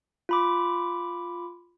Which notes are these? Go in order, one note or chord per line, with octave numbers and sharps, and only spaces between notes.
F4 B5 D6